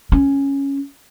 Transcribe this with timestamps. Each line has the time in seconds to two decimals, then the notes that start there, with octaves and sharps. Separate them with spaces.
0.12 C#4